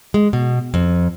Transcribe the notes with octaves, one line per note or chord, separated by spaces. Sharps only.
G#3
B2
F2